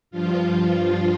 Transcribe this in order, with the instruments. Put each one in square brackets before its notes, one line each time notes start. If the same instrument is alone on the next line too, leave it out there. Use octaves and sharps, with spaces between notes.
[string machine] G2 F3 F4